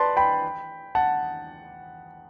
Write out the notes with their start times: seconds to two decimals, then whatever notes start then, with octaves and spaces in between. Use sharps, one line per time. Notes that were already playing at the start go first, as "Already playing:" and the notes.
Already playing: B4 D5 A5 C6
0.17 G5 B5
0.95 F#5 A5